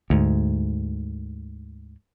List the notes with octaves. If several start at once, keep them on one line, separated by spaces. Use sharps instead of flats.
D2 G#2